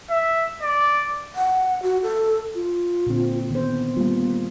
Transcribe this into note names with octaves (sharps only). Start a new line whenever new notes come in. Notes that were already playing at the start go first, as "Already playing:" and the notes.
E5
D5
F#5
F#4
A4
F4
A#2 D3 C4
D#3 B3 C5
G3 A#3 F4